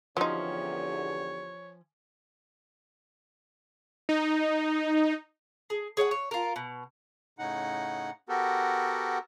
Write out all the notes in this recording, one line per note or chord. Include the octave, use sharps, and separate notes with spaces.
E2 D3 F3 F#3 C#4 D#4 G4 C#5
D#4
G#4
G#4 C#5 D#5 F#5
C#5
F4 A#4
B2
A2 C#3 D#4 F#5
B3 F#4 G4 A4 A#4